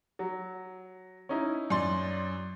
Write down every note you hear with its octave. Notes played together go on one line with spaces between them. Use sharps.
F#3
C#4 D#4 E4
F#2 D5 C6